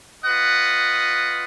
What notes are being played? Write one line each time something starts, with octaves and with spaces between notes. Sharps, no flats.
F4 B4 D#5 F#5